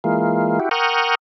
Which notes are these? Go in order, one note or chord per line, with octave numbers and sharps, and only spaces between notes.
E3 G#3 A#3 F4
E4 F#4 G4
A#4 F#5 G5 C#6 D#6 F6